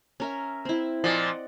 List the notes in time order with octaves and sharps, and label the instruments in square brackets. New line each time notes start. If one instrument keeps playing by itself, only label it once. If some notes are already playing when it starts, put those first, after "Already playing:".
[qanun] C#4 A#4 E5
C4 E4
[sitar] A#2 F3 [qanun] D5 D#5 F#5